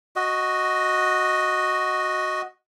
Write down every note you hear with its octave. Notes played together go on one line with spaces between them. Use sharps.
F#4 D#5